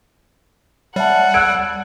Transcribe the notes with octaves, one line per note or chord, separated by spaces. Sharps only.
G3 C#5 E5 F#5 A5
E6 F#6 G#6 D7